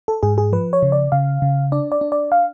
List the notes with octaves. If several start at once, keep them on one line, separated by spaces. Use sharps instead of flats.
A4
G#2 G#4
G#4
F3 B4
C#5
C#3
D5
C#3 F5
C#3
D4 D5
D5
D4
D5
F5